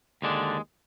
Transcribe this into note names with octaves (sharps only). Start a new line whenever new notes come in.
D#2 D3 G#3 D4